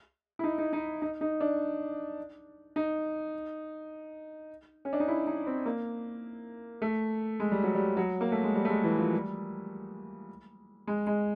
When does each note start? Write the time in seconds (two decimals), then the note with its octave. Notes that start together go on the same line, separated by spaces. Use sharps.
0.39 E4
0.44 D#4
0.58 D#4
0.73 D#4
1.02 D#4
1.21 D#4
1.40 D4
2.76 D#4
4.85 C#4
4.93 D4
5.00 D#4
5.08 E4
5.27 D#4
5.47 C4
5.66 A#3
6.82 A3
7.40 G#3
7.52 G3
7.64 F#3
7.75 G3
7.97 F#3
8.21 A#3
8.32 A3
8.44 G#3
8.55 G3
8.65 A3
8.70 G#3
8.84 E3
8.99 F3
9.14 G3
10.87 G#3
11.07 G#3